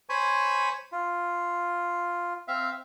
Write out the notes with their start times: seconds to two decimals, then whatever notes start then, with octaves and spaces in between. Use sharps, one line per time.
0.09 C5 C#5 G#5 B5 C#6
0.92 F4
2.48 C4 E5 F5